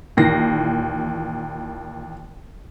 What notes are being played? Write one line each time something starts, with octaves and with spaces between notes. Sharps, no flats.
D#2 A#2 D#3 E3 A#6 C7